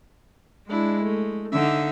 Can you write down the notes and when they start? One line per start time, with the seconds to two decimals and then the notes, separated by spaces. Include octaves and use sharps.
0.69 G#3 D4 E4
1.04 A3
1.52 D3 D#4 E5